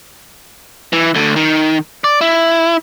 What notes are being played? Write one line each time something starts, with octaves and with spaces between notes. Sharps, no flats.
E3
D2 D3
D#3
D5
E4